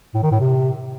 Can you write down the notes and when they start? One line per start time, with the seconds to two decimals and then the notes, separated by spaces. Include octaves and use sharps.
0.14 A2
0.23 D#3
0.32 A2
0.40 C3